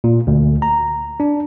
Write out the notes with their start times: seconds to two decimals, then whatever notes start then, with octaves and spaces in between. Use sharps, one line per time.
0.04 A#2
0.27 D2
0.62 A#5
1.20 D4